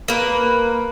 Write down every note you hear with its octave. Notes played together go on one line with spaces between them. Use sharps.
A#3 B4